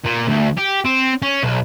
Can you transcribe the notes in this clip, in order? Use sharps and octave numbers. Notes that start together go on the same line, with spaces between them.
A#2
D2
G4
C4
C#4
B1